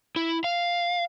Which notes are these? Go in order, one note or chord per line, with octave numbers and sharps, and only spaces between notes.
E4
F5